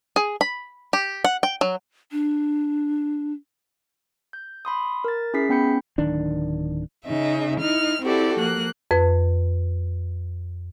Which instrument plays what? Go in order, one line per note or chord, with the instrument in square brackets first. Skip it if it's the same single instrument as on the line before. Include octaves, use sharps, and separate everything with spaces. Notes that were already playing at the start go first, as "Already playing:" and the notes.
[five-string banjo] G#4
B5
G4
F#5
G5
F#3
[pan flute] D4
[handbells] G6
B5 C6 D#6
A#4 A6
C#4 E4 G#4 B6 C7
B3 C#4 G5 B5 G6 C#7
[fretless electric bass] D1 D#3 D4
[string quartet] C#3 D#4 E5
D#4 E4 F6
C4 E4 F#4 G4 A4 D5
F3 A#3 F#6
[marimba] F2 B4